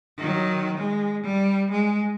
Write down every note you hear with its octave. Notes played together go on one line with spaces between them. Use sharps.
D#3 F#3
G#3
G3
G#3